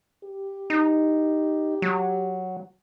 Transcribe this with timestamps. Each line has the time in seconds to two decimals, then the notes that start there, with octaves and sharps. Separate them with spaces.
0.24 G4
0.70 D#4
1.82 F#3